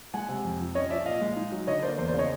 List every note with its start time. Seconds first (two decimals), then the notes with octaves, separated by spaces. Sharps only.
0.14 G#3 F#5 G#5
0.29 C3
0.45 F2
0.60 F3
0.75 C#4 C#5 D#5
0.90 F3 D5 E5
1.06 A#2 D#5 F5
1.21 G#3
1.36 D#4
1.52 F#3
1.67 D3 C#5 D#5
1.83 A#3 C5 D5
1.98 E2 C5 D5
2.08 C5 D5
2.14 C#3
2.19 C#5 D#5